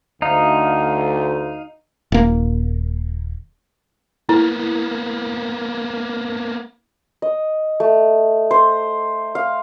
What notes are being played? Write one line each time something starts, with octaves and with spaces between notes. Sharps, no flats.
D2 D#4 F5
D#1 A#3
A#3 B3 E4
D#5
A3
C5
F5